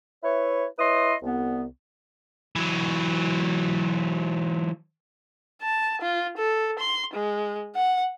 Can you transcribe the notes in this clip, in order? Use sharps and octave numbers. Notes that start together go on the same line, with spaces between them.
E4 B4 C#5
E4 B4 C#5 D#5 C6 D#6
C2 B3
E3 F#3
A5
F4
A4
C6
G#3
F#5